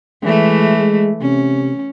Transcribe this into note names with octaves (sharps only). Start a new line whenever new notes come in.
E3 G#3 A3
G#3
C3 C#4